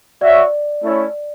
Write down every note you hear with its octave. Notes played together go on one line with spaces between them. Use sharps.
F#4 C#5 D5 E5
A3 C#4 E4 A4 C#5